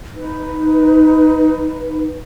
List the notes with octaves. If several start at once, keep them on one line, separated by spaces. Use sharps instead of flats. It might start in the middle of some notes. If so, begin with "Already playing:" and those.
D#4 B4